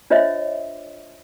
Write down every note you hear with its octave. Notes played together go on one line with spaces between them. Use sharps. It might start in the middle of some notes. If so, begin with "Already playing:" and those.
D4 F4 C5 C#5 D#5 E5